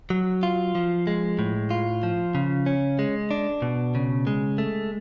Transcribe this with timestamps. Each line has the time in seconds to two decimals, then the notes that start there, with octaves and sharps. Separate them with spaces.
0.10 F#3
0.43 F4
0.75 F3
1.07 G#3
1.39 A2
1.71 F4
2.03 F3
2.35 C#3
2.66 C#4
2.99 G#3
3.31 D4
3.62 B2
3.95 C#3
4.27 G#3
4.58 A3